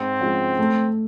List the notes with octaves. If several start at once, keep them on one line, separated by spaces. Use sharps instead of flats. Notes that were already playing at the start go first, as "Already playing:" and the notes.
Already playing: G#2 C4
F3 G#3 C#4 F#4
A3